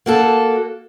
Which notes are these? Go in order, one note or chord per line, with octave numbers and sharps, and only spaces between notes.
A#3 F#4 A4